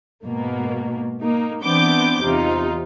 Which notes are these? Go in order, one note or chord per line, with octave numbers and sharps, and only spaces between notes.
G#2 B2 A#3
A#3 D#4
E3 B3 C4 D4 D6 G6
E2 C3 D#4 F4